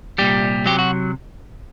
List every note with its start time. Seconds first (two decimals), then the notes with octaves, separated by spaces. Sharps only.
0.18 C2 A#2 G3 G4
0.66 C3 F#3 G4
0.79 F#4